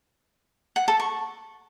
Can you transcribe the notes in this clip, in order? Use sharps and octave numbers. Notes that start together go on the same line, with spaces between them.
F#5
A4
C#6